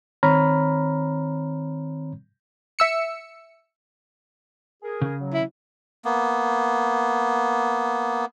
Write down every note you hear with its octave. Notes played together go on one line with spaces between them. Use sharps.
D#3 C4 C#5 A#5 B5 F6
E5 E6 C#7
G#4 A#4
C#3
F#3
E4
A#3 B3